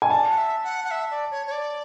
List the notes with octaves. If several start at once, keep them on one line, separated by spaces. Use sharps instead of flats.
G#5
D5 A5
F#5
E5
F#5
F#5
E5
D5
C#5
C#5
D5